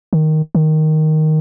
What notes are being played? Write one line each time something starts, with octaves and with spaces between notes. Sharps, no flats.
D#3
D#3